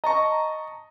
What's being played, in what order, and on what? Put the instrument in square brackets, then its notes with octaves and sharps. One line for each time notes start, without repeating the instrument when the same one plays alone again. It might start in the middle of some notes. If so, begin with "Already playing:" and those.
[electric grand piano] D#5 A5 C#6 [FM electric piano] A#5